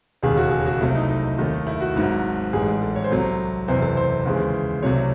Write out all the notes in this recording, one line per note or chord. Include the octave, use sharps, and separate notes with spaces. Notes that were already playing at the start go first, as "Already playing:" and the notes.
E1 D#2 C#3 G#4
F#4
A4
G#4
F#4
C2 C3 F#3 A3 E4
D#4
D#4
D#2 D#3 A3
E4
F#4
G#1 G#2 D#3 F#3
A1 G#2 E3 G#3 G#4
A4
C#5
C5
C2 C3 F#3 A4
C5
F#1 E2 C3 E3 C5
A4
C5
D#2 C#3 E3 G#3
C2 C3 F#3 A3 C#5